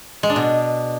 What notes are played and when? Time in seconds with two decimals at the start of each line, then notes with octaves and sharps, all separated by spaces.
0.23 G#3
0.30 D4
0.36 B2